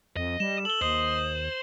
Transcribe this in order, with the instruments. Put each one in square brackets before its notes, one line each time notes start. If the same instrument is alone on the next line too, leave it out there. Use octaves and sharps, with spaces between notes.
[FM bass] F2 [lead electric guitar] D#5
[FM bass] G3 [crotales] E7
[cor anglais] A4 [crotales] F#7 G7
[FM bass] D#2 [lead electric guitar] C5 [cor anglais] D#5